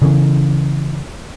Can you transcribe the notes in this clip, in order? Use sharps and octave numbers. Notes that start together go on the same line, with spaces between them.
C#3 E3 C#4